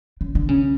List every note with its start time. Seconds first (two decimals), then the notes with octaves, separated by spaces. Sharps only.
0.21 C#3
0.35 D3
0.49 C#3